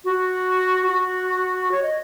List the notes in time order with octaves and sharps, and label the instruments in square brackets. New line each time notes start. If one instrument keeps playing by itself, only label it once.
[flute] F#4
F#4
C#5
D#5